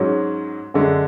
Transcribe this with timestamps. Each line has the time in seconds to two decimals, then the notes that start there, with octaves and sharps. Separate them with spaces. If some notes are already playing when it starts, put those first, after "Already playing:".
Already playing: G#2 F#3 C#4
0.74 F#2 D3 G#3